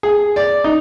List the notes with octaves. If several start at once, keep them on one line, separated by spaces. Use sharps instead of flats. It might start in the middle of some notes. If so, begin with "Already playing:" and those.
G#4
D5
D#4